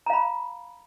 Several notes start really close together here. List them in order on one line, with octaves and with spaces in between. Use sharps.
A#5 F5 B5